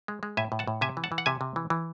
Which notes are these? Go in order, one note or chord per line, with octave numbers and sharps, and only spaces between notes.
G#3
G#3
A2 E5 G#5
A2
F#5 A5
A2
C3 E5 G#5
E3
F#5 A5
E3
F#5
C3 E5 G#5
C3
E3
E3